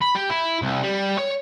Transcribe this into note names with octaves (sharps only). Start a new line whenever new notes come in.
B5
G4
E4
C2
G3
C#5